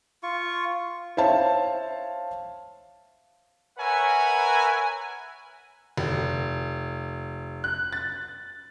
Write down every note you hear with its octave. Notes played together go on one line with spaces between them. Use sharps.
F4 C#6
C5 C#5 E5 F5 A5
A#4 B4 C#5 E5 F#5 G#5
F1
F#6
A6